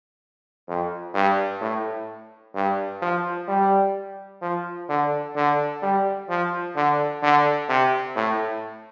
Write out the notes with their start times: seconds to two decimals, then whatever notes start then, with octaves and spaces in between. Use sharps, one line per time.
0.68 F2
1.14 G2
1.61 A2
2.55 G2
3.02 F3
3.48 G3
4.42 F3
4.89 D3
5.36 D3
5.82 G3
6.29 F3
6.76 D3
7.23 D3
7.69 C3
8.16 A2